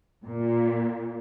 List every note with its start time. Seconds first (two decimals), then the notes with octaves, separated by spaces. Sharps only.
0.24 A#2